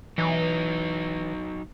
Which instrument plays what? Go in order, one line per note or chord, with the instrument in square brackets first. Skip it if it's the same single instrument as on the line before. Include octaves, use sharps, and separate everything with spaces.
[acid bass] E3 [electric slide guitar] F#3 D#4